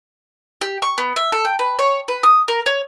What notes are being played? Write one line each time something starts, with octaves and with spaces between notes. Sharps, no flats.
G4
C#6
B3
E5
A4
G5
B4
C#5
B4
D#6
A#4
C#5